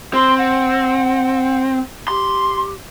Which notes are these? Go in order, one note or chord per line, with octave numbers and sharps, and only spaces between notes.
C4 C6
F#5
G4 C6